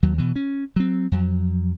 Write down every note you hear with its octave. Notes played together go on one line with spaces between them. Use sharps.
D#2 F#3
B2 E3
C#4
F#3 C4
F2 F#3